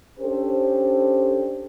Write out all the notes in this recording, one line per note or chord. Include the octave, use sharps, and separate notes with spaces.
C#4 D4 G4 A4 C5